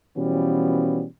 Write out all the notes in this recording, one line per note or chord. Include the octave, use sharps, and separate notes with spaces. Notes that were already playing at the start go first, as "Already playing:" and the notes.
B2 E3 F3 G3 B3 C#4